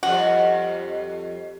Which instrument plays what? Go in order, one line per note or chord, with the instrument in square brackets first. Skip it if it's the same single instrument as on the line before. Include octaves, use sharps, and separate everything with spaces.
[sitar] F2 G3 F4 [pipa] F#4